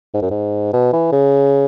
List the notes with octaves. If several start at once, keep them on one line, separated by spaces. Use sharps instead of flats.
G#2
F#2
G#2
B2
E3
C#3